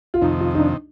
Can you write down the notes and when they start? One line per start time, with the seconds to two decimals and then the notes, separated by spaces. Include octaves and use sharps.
0.14 F4
0.21 F2 C3 D#3 D#4
0.40 F4
0.55 D#4
0.59 D4